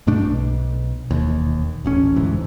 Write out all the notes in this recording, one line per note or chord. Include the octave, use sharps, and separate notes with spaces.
G2 B2 A3 D4
B1
E1 D#2
D#1 A1 C#4
F#1 D2 G#2 E3